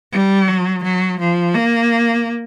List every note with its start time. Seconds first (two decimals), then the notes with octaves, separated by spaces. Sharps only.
0.12 G3
0.48 F#3
0.83 F#3
1.20 F3
1.55 A#3